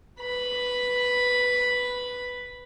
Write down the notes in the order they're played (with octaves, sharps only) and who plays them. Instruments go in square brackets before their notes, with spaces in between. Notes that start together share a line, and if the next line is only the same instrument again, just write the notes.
[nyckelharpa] B4 B5